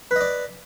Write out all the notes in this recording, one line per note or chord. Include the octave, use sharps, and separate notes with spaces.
B4 D5 D#5